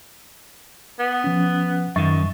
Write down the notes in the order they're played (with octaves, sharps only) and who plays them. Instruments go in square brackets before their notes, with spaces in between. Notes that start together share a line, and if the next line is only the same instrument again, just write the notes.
[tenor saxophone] B3
[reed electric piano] F3 C#4
[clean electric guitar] F#2 D#3 [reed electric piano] E5 C#6 A6